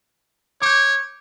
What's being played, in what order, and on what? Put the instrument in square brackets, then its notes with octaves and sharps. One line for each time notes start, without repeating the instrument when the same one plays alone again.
[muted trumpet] C#5 [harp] D6 G6